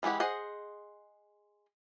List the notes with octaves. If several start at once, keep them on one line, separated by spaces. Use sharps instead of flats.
E3 G#3 E4 G4 F#5
G#4 C5 D#5 F#5